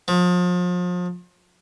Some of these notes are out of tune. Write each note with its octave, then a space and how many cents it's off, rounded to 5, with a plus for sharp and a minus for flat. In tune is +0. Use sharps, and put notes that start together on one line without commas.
F3 +35